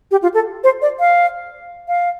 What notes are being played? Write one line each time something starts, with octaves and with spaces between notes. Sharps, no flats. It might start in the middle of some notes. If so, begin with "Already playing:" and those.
G4
F4
A4
C5
D5
F5
F5